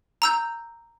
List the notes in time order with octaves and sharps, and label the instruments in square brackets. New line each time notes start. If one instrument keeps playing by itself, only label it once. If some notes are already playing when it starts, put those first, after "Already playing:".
[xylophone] A#5 E6 G6